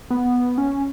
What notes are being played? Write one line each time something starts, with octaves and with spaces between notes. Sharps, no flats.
B3
C#4